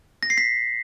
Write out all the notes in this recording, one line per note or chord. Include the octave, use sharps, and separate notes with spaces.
A#6
C7
B6